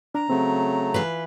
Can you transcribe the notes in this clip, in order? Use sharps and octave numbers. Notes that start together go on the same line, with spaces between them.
D4 A#5
C#3 F#3 A3 C4
E3 F4 B4